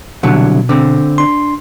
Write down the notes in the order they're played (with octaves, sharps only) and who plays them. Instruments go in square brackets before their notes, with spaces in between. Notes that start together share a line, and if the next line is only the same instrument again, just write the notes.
[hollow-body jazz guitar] C2 D3 F#3 [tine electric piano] B2
[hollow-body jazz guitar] D3 C4
[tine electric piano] D4 C6